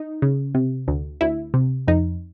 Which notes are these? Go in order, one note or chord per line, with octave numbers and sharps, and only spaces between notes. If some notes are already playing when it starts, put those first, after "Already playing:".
Already playing: D#4
C#3
C3
D2
D2 E4
C3
F2 D#4